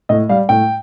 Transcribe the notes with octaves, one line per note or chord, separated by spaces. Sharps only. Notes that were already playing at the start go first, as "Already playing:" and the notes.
A2 D#5
G3 F5
A2 G5